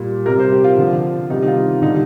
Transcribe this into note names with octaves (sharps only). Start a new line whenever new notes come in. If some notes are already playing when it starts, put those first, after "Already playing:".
Already playing: A#2 G3
C3 G3 A#4
C5
G4
F4
D3 F3
C3 D#3 G3 D#4
D#4
F4
D3 G3 D#4